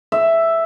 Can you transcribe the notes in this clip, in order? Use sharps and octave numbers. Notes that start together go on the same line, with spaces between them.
E5